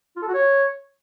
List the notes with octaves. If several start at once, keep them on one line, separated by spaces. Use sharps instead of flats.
F4
A4
F#4
C#5